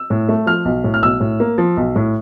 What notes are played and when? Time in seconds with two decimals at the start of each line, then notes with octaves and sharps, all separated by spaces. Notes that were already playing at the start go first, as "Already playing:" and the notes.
Already playing: E6
0.10 A2
0.29 A3
0.46 F3 F6
0.65 B1
0.84 A2
0.94 F6
1.02 B1 E6
1.20 A2
1.40 A#3
1.58 F3
1.77 B1
1.96 A2